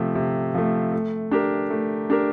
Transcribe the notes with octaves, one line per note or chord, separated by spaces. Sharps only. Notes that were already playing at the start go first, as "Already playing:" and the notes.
Already playing: C3 F3 A3
C3
F3 A3
A3
D4 G4 A#4
A3
D4 G4 A#4